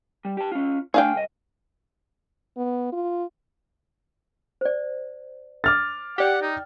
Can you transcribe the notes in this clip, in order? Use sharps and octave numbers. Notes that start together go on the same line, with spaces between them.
G3
G4 A5
C#4 F4
A3 D4 G#4 F5 G5
C2 D#5
B3
F4
C5 D5
D6 F6 A6
G4 D5 F#5 G5
D#4